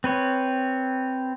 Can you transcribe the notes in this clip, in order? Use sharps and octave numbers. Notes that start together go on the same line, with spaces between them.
C4 B4 C#5